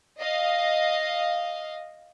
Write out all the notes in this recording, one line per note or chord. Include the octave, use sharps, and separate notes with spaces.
D#5 F5